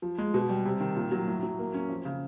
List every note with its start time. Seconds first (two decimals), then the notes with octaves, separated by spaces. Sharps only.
0.02 F3
0.18 G#3
0.34 B2
0.49 G3
0.65 C3
0.81 D#3
0.96 A#2
1.12 F#3
1.27 A2
1.43 F#3
1.59 A#3
1.74 C#4
1.90 F2
2.05 C#3